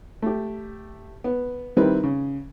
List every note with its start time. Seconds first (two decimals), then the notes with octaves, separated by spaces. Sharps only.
0.22 A3 G4
1.24 B3
1.77 D#3 G3 C4 E4 B4
2.04 C#3